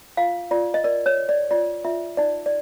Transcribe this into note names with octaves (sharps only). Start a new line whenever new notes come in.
F4 F5
F4 D5
D#5
A#4 D5
C#5
C#5
D5
F4 D5
F4 E5
D#4 D5
D5